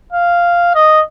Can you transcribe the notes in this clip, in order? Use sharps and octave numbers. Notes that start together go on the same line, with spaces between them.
F5
D#5